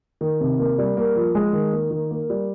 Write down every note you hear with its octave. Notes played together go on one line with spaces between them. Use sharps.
D#3
C3
A#3
G3
A#3
F3
G#3
D#3
A#3
D#3
A#3
G3